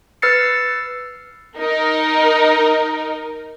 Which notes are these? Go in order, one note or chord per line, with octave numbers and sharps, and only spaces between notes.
B4 E6 F6 A6 C7 C#7
D#4 A#4